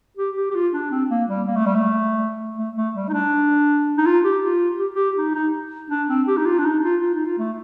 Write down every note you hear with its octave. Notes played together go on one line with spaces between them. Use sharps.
G4
G4
G4
F4
D4
C4
A#3
G3
A#3
A3
G3
A3
A3
A3
G3
D#4
D4
D#4
F4
G4
F4
G4
G4
D#4
D#4
D4
C4
G4
D#4
F4
D4
D#4
F4
F4
D#4
F4
A3